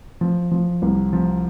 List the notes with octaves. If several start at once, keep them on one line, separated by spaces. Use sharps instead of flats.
F3
F3
C2
F3